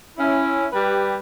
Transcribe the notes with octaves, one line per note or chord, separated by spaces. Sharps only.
C#4 E4
G3 G4 B4